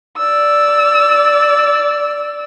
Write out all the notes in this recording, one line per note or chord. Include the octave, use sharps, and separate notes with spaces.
D5 E6